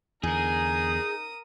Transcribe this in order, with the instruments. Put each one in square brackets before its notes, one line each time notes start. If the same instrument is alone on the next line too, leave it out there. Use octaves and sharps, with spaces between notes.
[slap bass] E2 D3 [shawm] D#4 [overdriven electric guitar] G#4 [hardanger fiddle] A#4 D#6